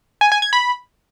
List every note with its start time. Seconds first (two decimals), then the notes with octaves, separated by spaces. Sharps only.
0.21 G#5
0.32 G#5
0.42 G#6
0.53 B5